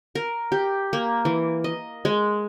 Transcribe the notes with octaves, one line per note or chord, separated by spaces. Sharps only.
A#4
G4
A#3
E3
D#5
G#3